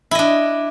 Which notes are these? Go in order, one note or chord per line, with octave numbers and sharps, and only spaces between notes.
D4 E4 D#5